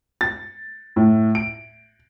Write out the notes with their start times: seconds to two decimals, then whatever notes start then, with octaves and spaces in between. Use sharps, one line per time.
0.21 A6
0.96 A2
1.35 D7